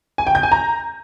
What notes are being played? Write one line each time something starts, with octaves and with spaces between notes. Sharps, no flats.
G#5
G5
G6
G#5
A#5